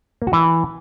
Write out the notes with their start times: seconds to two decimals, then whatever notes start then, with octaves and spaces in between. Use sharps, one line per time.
0.22 A#3
0.27 F#4
0.33 E3